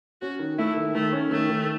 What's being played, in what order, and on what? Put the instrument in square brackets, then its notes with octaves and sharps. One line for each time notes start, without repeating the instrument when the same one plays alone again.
[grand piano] C#4 [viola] F#4
[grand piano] D#3
[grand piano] A3 [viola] E4
[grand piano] D#3
[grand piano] D#3 [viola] A3
[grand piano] C#4
[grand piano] D#3 [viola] A3
[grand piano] D#3